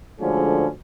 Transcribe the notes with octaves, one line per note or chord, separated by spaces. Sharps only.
D2 D3 F3 G#3 C#4